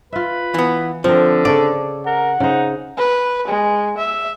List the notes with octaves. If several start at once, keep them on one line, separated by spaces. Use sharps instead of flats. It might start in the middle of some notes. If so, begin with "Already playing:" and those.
F4 B4 E5
E3 B3
D3 F3 C4 A#4
C#3 A4 C#5 D5
A#4 F#5
C#3 D#4 C5
B4
G#3
E5